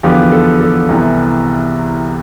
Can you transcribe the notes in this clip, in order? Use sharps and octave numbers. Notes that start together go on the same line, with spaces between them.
E2 D3 F3 B3 G4
A4
A4
C2 C3 E3 B3